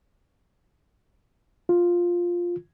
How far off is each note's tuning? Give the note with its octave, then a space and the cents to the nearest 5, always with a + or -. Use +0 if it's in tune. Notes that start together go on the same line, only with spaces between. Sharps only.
F4 +5